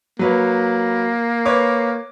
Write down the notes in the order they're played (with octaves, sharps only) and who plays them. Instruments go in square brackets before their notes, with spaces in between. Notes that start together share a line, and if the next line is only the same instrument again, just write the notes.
[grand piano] F#3 B4 C#5 [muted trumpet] A#3
[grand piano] B4 C#5 D6